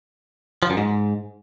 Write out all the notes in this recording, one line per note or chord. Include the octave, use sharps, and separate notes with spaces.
F3
F#2
G#2